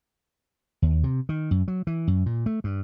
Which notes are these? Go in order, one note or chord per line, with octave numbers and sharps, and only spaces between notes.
D#2
C3
D#3
F#2
F#3
E3
F#2
A#2
A3
G2